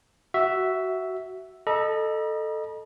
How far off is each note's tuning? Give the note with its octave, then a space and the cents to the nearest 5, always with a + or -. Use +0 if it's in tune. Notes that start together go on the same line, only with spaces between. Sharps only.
F#4 +15 E5 +0
A4 +0 D#5 -25 A#5 +45